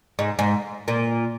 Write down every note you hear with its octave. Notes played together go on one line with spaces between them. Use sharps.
G#2
G#2
A#2